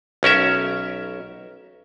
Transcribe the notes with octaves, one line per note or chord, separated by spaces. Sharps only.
B1 C#4 A#4 E5